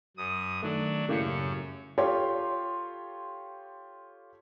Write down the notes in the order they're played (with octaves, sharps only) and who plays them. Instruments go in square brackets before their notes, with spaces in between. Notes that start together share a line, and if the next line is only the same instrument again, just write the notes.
[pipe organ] F#2 D#6
[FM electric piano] D#3 A3 [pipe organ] F#3 D4
[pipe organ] F#2 F#3 [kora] A2 A#3 G4 [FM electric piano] C#3 C#7
[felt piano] F4 G4 A4 C#5 G5 C6